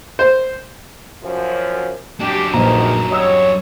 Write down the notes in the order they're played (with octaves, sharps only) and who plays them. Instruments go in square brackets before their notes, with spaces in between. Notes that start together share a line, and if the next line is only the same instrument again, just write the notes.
[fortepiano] C5
[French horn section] F#2 F3
[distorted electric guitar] F#2 D4 [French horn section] G4
[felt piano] A#1 [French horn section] E2 B2 D#3 [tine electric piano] A#5
[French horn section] F#3 G3 C#5 [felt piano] D#5 D#6 E6